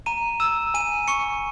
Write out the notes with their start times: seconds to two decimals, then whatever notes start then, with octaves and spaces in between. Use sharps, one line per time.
0.06 A#5 D#7
0.40 E6 E7
0.74 G#5 D#7
1.08 C#6 C#7